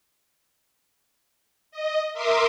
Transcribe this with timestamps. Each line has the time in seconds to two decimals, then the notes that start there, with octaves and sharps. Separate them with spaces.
1.71 D#5
2.13 A#4 E5 C6 D6 D#6